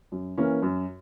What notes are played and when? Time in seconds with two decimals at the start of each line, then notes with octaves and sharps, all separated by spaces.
0.12 F#2
0.38 E3 A#3 C#4
0.62 F#2